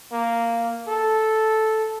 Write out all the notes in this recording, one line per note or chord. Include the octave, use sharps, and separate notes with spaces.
A#3
A4